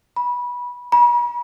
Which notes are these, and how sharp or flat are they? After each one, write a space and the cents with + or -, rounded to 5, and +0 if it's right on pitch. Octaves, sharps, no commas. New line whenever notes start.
B5 -20
B5 -45